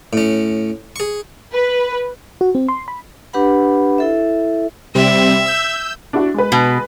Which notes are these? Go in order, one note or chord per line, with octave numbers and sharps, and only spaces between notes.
A2 C#4
G#4 C#6
B4
F#4
C4
C6
B5
D4 G4 B4 F#5 B5
E4 A4 E5
C3 G3 C4 E5
E6 G6
D4 E4 F#4
G#3 B4
B2